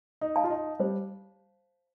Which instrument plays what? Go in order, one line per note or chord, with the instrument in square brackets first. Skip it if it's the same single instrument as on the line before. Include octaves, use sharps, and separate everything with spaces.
[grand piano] D#4
[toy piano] F5 A5
[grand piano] F4
D#4
[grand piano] G3 [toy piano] C5